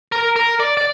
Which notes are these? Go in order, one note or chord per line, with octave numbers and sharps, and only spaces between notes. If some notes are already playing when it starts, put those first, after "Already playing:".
A#4
A#4
D5
D5